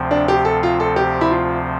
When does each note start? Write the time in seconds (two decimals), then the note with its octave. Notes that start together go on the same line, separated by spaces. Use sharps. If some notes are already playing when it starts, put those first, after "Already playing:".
Already playing: D2 C3 F3 C4
0.11 D4
0.28 G4
0.45 A4
0.63 F4
0.80 A4
0.96 G4
1.21 E4
1.31 F4